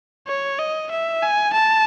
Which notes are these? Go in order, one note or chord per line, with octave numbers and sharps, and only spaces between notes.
C#5
D#5
E5
G#5
A5